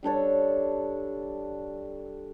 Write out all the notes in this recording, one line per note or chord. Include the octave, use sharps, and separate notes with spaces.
G3 D4 A4 C#5